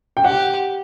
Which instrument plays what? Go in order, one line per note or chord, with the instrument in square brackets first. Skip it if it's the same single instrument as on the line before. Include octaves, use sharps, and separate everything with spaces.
[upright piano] G5
[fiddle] G4 [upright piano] F#5